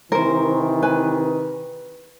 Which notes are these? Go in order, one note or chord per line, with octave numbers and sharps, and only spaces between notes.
C3 D#3 E3 A#4 C5
B4 G#5